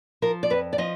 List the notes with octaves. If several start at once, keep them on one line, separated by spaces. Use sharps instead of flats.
F3 A#4
D5
F2 B4
D5
F3 D#5